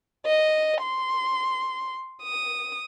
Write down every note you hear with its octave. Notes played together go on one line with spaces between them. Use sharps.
D#5
C6
D#6